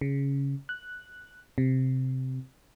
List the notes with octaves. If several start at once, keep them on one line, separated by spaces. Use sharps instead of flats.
C#3
F#6
C3